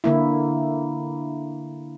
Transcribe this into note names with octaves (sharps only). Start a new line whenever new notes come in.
D3 A#3 E4